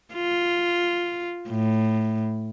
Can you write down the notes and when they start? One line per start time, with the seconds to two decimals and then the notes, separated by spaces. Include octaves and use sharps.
0.15 F4
1.49 A2